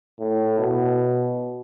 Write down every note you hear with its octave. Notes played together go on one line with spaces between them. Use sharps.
A2
B2